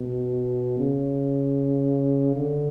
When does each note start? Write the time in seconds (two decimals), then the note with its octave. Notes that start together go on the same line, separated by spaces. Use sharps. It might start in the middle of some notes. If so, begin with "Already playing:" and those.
Already playing: B2
0.78 C#3
2.36 D3